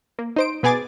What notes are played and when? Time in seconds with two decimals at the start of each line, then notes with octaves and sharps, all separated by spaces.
0.19 A#3
0.36 D#4 C5 D7
0.63 B2 B3 G#4 G#5 D6 A6